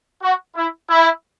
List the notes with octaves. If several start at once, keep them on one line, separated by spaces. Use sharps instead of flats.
F#4
E4
E4